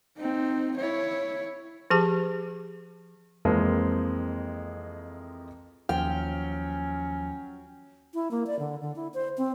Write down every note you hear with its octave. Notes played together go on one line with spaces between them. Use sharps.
C4 D#4
E4 C#5
F3 G4 G#4 A5
F2 E3 G#3 A#3 C4
D#2 F3 F#3 C#4 G5 F6
E4
A#3
D5
D3
D3
E4
C5
C4